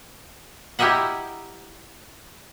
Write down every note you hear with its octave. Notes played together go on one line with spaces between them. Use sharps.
E4 G4 A#4 D#5 E5 F#5